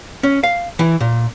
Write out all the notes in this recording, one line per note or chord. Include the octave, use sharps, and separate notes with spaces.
C#4
F5
E3
A#2